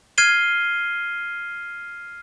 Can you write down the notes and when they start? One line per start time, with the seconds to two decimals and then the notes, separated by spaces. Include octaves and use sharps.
0.18 F6 G#6 C7 D#7 G7